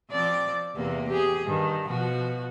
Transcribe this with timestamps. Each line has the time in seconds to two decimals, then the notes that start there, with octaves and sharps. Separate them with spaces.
0.11 F3 C4 D5
0.75 E2 C3 A#3
1.09 G4 G#4
1.46 G2 D#3
1.87 B2 F3 F#4